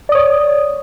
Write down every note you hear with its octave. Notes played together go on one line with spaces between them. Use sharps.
C#5 D5 D#6